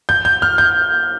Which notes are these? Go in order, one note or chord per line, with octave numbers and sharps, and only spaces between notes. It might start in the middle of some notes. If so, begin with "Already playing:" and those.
G6
G6
F6
G6